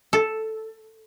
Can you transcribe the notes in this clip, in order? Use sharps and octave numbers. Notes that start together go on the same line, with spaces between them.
A4